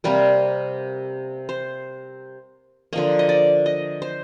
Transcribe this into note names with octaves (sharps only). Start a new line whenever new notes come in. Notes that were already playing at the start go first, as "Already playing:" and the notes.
C3 G3 A#3 A#4
C5
D3 F3 A#3 D#5
D#5
D5
D#5
C5